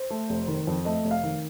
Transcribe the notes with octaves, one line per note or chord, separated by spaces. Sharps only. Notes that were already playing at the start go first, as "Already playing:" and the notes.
Already playing: C5
A3
F1
D#3
F2
A3 D#5
F1
F5
D#3